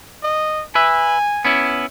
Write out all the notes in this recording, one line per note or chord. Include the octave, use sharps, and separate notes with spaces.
D#5
B4 E5 G#5
B3 C#4 E4